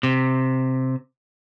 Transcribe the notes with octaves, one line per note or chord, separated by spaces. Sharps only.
C3